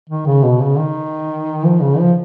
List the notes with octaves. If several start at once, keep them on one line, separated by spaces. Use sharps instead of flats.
D#3
C#3
B2
C#3
D#3
F3
C#3
F3